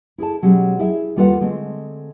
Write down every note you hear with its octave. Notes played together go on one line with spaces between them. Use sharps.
E4 G#4 A4 A5
B2 F#3 G#3 C#4 G4
E4 G#4 E5
D#2 G3 F4 A4 B4 F#5
D3 G#3 A3 C4